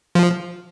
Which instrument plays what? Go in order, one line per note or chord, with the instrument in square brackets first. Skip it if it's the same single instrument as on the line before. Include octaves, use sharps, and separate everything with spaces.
[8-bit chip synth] F3